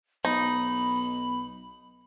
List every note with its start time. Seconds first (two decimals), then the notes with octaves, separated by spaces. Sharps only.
0.25 B1 D#4 B5